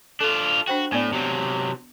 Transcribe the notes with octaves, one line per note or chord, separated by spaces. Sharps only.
D4 F4 A4
D4 F#4 C5 G5
A2 B3 D5
C3 F#3